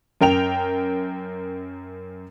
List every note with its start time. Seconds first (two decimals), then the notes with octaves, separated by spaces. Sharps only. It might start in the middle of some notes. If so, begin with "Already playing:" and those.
0.21 F#2 A#4 G5 F7